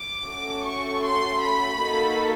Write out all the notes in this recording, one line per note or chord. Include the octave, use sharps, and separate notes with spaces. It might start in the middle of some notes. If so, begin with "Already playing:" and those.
Already playing: D6
A3 C#4 F#4 A4
C#6
C6
B5
A#3 D#4 F#4 A4